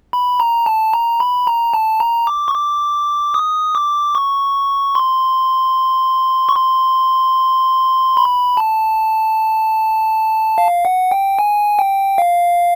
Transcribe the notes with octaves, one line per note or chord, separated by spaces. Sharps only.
B5
A#5
A5
A#5
B5
A#5
A5
A#5
D6
C#6
D6
D#6
D6
C#6
C6
C#6
C6
B5
A5
F5
F#5
G5
G#5
G5
F5